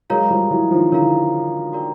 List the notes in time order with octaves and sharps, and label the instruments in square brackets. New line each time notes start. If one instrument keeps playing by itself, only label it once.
[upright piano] F#3 G#3 [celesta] A#4 C#5 F5 A#5
[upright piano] F3 G3
E3 F#3
D#3 F3
[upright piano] D3 E3 [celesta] A#4 C#5 F5 A#5
[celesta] F#4 A#4 D5 G5 A#5